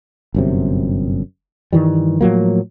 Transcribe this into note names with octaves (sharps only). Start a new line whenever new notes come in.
G1 F#2 C3
G2 D#3 E3 G3
A2 F3 F#3 A#3